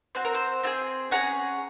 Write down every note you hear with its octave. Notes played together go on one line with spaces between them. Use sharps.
C4 F#4 C5
A#4
C5
C4 F4 G#4
C#4 G#4 F#5 A#5